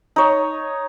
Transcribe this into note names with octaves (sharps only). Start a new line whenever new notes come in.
D#4 C#5